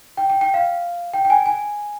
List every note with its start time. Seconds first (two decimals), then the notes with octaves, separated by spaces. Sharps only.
0.17 G5
0.30 G5
0.41 G5
0.54 F5
1.13 G5
1.25 G5
1.30 G#5
1.46 G#5